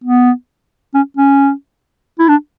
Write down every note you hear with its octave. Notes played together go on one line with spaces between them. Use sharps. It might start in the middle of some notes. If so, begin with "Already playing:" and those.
B3
C#4
C#4
E4
D4